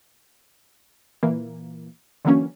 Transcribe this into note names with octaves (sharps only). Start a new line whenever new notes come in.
A#2 E3 A#3
D3 E3 F#3 A#3 C#4